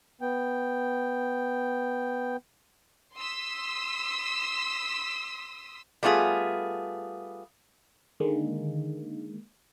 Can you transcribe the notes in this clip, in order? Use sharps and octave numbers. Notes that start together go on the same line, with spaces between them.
B3 G5
C6 D#6 E6 B6
G3 A3 B3 F4 G#4
D3 D#3 G#3 A#3